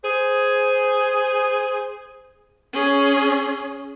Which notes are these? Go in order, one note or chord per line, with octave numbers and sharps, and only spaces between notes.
G#4 C5
C#4 G#4